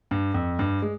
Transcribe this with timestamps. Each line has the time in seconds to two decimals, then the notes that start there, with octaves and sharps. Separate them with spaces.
0.11 G2
0.34 F2
0.59 G2
0.82 G#3